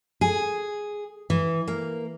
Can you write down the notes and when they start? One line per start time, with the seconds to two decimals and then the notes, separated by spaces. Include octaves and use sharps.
0.21 G#4
1.30 E3
1.68 A#3